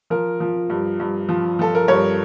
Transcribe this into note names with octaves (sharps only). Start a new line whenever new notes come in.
F3 A#4
F3
G2
G2
F3
F3 A4
A#4
G2 C#5